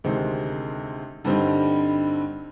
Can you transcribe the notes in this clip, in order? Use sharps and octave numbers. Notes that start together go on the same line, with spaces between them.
D2 C3 D#3 G#3 C4
G2 D3 G3 C4 D#4